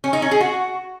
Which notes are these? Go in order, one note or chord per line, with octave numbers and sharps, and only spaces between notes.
C#4
D#4
C#4
G#4
F#4